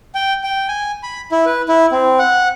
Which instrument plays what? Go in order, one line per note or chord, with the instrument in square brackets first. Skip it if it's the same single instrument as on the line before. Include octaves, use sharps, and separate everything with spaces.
[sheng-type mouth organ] G5
G5
G#5
B5
E4
B4
E4
C4
F#5